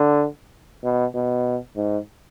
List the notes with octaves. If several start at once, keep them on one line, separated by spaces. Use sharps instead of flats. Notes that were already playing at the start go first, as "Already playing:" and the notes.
Already playing: D3
B2
B2
G#2